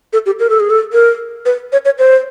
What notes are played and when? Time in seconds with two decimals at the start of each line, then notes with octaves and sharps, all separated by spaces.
0.13 A4
0.26 G4
0.39 A#4
0.50 A4
0.60 G#4
0.70 A4
0.93 A#4
1.45 B4
1.72 C#5
1.85 C#5
1.99 C5